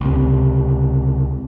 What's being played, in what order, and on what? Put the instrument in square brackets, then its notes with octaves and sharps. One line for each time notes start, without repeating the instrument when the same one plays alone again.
[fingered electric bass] C#2 C3